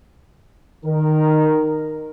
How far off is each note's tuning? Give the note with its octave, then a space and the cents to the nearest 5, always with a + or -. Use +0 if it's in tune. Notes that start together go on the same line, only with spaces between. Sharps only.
D#3 -15 A#4 +0